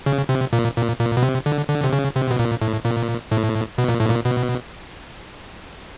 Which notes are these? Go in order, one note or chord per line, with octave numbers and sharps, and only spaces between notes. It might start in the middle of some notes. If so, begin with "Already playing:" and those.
C#3
C3
A#2
A#2
A#2
B2
C3
D3
D3
C3
C#3
C3
B2
A#2
A2
A#2
A2
B2
A#2
A2
A#2
B2